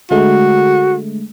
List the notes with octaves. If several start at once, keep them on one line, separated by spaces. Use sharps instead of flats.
D3 G#3 A3 F#4